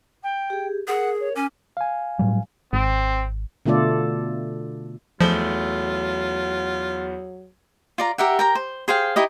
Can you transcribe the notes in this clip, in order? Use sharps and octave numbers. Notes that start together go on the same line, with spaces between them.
G5
G4 G#4
G#4 A#4 F#5
C#5
C#4 G#5 D6
F5 G#5
A2 F#3 G3
G#1 C4
B2 D3 A3 F4 A4 D5
E2 F3 F#3 A3 F4 G7
F4 D5 A#5
G4 A#4 E5 F#5
A#4 G5 A#5
C5
G#4 C5 F5 G5
D#4 E4 G4 D#5